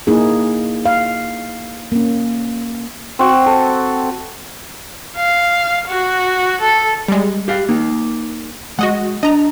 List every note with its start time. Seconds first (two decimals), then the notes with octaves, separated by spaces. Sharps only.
0.07 A#3 D#4 E4 G#4
0.86 F5
1.92 A#3 C#4
3.19 C4 F#4
3.46 A4
5.17 F5
5.88 F#4
6.61 A4
7.08 G3 G#3
7.48 G4 F5
7.69 A#3 D#4
8.79 G#3 F#4 D#5 F#5
9.23 D4 D#5 A#5